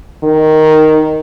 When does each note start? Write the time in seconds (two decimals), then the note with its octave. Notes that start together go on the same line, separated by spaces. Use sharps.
0.23 D#3